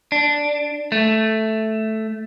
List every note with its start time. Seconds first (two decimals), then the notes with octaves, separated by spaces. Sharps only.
0.12 D4
0.92 A3